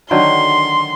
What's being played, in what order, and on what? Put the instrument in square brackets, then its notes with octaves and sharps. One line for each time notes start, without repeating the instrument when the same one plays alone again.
[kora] D3 D#3 F#3 [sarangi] C6